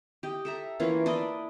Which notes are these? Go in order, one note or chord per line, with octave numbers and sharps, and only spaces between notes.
G4 D#5
A4 E5 A#5
E3 A#3 C#4 F4
D4 E4 D5 D#5